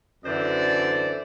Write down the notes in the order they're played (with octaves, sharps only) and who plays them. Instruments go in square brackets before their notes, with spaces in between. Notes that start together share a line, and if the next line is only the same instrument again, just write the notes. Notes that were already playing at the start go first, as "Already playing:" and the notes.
[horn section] F#2 D3 E3 C5 D5